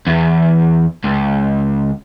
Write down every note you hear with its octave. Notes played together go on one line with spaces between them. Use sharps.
E2
C#2